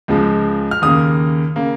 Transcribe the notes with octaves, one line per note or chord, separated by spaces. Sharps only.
C#2 C#3 F3 G#3
F6
D#2 C#3 A#3 D#6
C#3 A#3